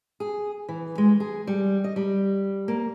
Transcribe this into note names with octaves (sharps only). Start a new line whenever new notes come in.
G#4
E3
G#3
G#4
G3
D#5
G3
A#3